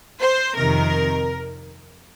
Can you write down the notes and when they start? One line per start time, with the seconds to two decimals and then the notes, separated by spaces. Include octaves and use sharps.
0.21 C5
0.56 F2 C3 D#3 A#4